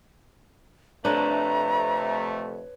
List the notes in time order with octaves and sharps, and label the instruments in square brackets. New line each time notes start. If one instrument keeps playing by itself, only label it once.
[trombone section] F2 C3 A3 [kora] D4 [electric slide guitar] B4 C#5 [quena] A#5